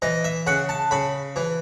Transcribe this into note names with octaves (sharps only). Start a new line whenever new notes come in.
E3 D#5
E5
C#3 F#5
A5
C#3 B5
E3